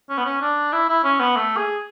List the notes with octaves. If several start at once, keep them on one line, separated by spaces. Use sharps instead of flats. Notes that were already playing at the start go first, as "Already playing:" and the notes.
C#4
B3
C#4
D4
E4
E4
C#4
B3
A3
G#4